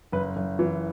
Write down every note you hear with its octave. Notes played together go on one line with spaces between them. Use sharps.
F#1 B4
F#1
E3